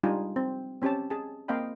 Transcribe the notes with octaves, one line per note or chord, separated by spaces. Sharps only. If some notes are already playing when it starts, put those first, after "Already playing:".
G3 G#3 D4 D#4 F4 G#5
C4
C4 C#4 G4 C#5 A5
G#4 A5
A#3 C4 D#5 F5 G5 B5